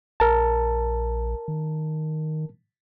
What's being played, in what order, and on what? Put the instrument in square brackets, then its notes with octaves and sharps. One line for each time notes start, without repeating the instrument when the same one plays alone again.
[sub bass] A#1 [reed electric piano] A#4 A5
[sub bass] D#3